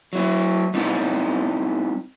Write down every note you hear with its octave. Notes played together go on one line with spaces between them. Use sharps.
F#3 E4
G3 C4 D#4 E4